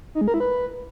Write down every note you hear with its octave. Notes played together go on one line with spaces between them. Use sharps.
D#4
G#3
A#4
E4
B4